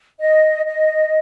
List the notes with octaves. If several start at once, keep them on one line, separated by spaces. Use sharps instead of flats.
D#5
D#5